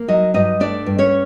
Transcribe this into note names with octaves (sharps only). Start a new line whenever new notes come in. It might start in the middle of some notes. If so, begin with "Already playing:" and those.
Already playing: A#3
F#3 D#4 D#5
G2 D#4 D#5
A3 D4 D5
G2
C#4 C#5